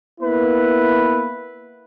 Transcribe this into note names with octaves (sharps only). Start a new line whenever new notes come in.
A#3 B3 E4 B4